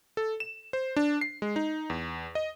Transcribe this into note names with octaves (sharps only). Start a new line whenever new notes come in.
A4
E7
C5
D4
C7
G#3
D#4
E2
D#5